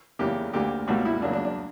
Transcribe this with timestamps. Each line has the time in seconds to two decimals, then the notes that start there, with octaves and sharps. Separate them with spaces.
0.19 E2 C#3 E3 A#3 G4
0.53 D2 D3 A#3 G4
0.88 C#2 B2 G3 A#3 F#4
1.05 E4
1.22 E2 C#3 F#3 A#3 D4
1.33 D4
1.45 D4